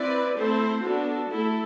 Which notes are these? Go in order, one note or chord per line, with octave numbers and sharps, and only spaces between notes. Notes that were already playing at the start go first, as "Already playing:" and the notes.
Already playing: C4 E4 B4 D5
A3 C4 E4 A4 C5
B3 D4 F#4 A4
A3 E4 A4